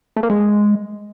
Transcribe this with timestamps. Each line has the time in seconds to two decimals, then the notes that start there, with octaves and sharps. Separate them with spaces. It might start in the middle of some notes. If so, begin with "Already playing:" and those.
0.16 A3
0.23 A#3
0.30 G#3